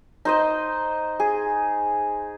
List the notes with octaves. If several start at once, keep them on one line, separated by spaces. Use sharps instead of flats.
D#4 C5 D#5
G#4